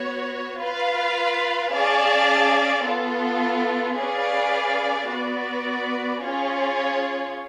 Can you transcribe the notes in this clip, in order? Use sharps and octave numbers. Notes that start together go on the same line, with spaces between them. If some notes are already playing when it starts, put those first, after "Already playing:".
Already playing: B3 F#4 C#5
F4 B4 F5
C#4 G#4 D5 F5 A5
B3 F4 A4
C#4 G#4 B4 D5 F5
B3 F#4 B4 D5
C#4 F4 G#4 C#5